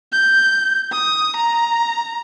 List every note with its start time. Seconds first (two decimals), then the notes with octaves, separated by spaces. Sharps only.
0.12 G6
0.91 D#6
1.36 A#5